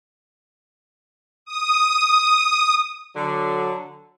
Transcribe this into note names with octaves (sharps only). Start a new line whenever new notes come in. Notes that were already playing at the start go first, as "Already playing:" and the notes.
D#6
D3 F#3